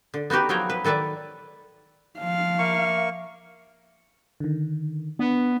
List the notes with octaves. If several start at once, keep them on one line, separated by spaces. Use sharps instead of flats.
D3
B3 D#4 F#4 G4 B4
F3 F#3 B3 C#5 G5 A#5
B4
D#3 A4 B4 D5 E5
F3 F5
A#3 E5 C#6
D3 D#3
B3 D4